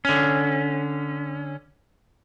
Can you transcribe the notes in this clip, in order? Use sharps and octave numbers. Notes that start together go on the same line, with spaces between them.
D3 C#4